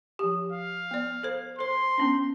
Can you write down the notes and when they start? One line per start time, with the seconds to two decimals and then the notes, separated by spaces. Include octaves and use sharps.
0.19 F3 G4
0.53 F5
0.91 B3 D5
1.23 A4 C5
1.59 A4 C5 C6
1.98 B3 C#4 D4